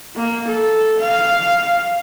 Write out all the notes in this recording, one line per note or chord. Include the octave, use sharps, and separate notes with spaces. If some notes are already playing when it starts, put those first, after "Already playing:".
A#3
A4
F5